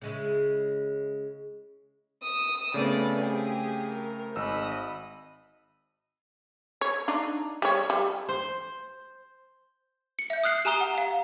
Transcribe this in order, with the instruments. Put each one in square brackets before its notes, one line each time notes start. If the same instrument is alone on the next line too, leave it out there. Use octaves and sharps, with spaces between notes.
[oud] C#3 G#3 E4
[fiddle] D#6 E6
[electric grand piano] C#3 A3 C4 [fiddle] B3 D5
[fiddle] G4 G#4
A#4
[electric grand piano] G#1 E6 [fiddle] D#5 B5
[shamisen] C#5
D4 D#4
G3 C#5
G3
[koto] C5
[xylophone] C#7
E5 G6
D#6 F6 F#6 C7
G4 G#5 A#5 D#6 G7
F#5
F5 A#5